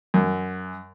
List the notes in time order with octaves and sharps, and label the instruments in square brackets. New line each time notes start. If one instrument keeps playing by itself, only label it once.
[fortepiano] F#2